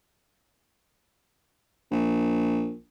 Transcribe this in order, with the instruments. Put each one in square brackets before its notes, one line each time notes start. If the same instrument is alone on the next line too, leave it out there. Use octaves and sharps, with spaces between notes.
[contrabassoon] A#1